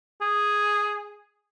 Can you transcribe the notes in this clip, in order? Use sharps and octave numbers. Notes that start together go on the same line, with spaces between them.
G#4